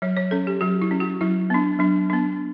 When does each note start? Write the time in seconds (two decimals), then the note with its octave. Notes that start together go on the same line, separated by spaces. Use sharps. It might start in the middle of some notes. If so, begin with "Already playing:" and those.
0.02 F#3 C#5
0.17 C#5
0.31 C#4 A4
0.47 G4
0.61 F#3 F#4
0.82 E4
0.91 C#4
1.00 F#4
1.21 F#3 E4
1.50 B3 D4
1.79 F#3 D4
2.10 B3 D4